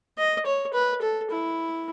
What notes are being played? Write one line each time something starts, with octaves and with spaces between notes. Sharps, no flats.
D#5
C#5
B4
A4
E4